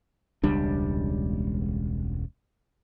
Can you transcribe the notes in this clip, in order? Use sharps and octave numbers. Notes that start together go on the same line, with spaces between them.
E1 C#2 G3 D4